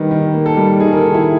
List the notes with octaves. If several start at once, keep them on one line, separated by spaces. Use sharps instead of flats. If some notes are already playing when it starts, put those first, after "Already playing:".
Already playing: D#3 G3 A#3 B4
D#3
A#3
A4
G3
D#3 G#4
A#4
A4
D#3
E4